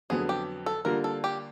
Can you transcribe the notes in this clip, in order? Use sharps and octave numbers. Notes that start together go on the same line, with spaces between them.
F2 D3 F#3 B3 G#4
G4
A4
D3 G3 A#3 D4 F4 A#4
A4
G4